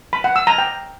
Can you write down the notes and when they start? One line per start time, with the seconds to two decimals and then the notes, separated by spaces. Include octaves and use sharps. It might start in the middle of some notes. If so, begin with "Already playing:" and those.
0.13 B5
0.24 F#5
0.36 E6
0.47 A#5
0.58 G5